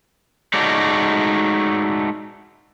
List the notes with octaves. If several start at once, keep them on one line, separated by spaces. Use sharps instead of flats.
G#3 A3 D#4 F#4 C#5 D5